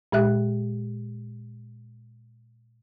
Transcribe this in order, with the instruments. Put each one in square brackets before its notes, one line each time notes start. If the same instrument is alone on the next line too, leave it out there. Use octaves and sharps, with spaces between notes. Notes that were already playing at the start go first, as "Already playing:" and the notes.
[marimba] A#2 G#3 G4 E5 F#6